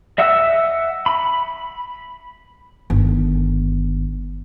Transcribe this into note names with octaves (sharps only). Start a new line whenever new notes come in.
D#5 E5 F#5 E6
B5
G1 D#3